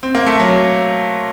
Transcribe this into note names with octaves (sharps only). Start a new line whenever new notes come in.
C4
A#3
A3
F#3